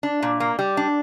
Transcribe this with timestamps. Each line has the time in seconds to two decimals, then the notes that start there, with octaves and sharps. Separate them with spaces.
0.03 D4
0.22 A#2
0.40 A#3
0.59 G3
0.77 D4